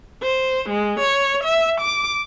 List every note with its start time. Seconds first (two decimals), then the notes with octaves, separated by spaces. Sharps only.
0.23 C5
0.70 G#3
1.00 C#5
1.44 E5
1.81 D6